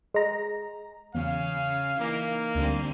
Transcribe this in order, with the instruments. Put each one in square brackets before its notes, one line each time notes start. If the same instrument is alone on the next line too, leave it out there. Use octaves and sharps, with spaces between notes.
[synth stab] G#3 A#5
[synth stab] E2 [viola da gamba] C#3 [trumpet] F5
[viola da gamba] E3 D#4 [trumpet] A#3
[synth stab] D2 [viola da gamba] D3 G3 C4